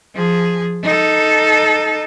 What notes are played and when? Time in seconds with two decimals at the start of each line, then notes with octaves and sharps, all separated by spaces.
0.14 F3 G#4
0.83 D#4 A4